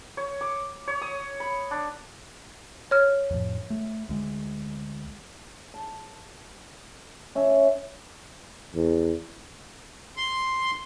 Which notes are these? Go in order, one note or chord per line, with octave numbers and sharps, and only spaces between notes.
C#5
D6
C#5
D#6
B5
D4
C#5 F6
F2 A2 F3
A3
D2 G#3
A5
C#4 E5
E2
C6